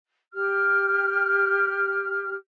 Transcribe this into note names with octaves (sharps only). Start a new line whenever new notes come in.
G4 F6